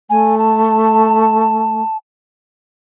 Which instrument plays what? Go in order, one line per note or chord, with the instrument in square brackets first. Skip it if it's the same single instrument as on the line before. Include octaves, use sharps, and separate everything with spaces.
[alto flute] A3 [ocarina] G#5
[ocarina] A5